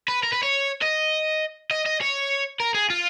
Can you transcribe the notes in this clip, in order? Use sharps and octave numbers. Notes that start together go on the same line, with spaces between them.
B4
A#4
B4
C#5
D#5
D#5
D#5
C#5
A#4
G#4
F4